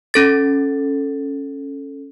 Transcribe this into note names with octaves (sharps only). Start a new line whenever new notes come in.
C#4 A4 A6